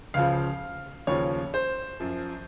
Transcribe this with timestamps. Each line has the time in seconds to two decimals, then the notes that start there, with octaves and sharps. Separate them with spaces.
0.14 C#2 C#3 F3 F5
1.07 D#2 C#3 F3 C#5
1.54 C5
2.00 F#2 F3